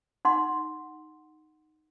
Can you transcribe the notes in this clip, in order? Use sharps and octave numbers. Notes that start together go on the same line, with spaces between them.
D#4 F#5 C6